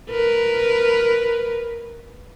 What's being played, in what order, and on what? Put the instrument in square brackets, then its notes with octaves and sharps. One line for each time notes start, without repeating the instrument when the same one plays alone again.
[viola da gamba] A#4 B4